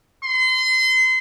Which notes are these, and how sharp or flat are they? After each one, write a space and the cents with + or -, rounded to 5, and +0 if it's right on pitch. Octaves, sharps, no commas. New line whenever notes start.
C6 -30